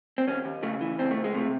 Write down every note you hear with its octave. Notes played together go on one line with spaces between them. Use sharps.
C4
D#2 C#4
D#2
C#3 A3
E3
C#2 C4
A3
C#2
G#3
C3 A3